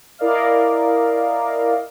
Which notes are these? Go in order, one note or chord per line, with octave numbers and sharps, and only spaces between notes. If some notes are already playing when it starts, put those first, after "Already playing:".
E4 A#4 D5 D#5 F5